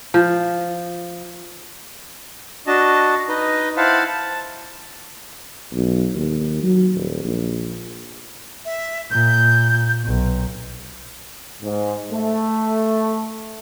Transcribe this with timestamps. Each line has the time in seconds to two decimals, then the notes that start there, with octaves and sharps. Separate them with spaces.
0.14 F3
2.67 D4 F#4 D#5 A5
3.28 D#4 B4 D#5
3.77 E4 C5 F5 F#5 A5 B5
4.07 A5
5.73 B1
6.15 D#2
6.64 F#3
6.96 D#1
7.25 A#1
8.65 E5
9.11 A#2 G6
10.05 B1
11.62 G#2
12.12 A3